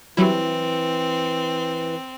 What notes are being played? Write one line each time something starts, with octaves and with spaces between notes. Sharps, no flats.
E3 F#3 G3 C4 E4